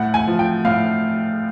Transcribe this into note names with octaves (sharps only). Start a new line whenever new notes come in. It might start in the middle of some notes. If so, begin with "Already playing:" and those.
Already playing: A2 F#5
G#5
F3
G5
A2 F5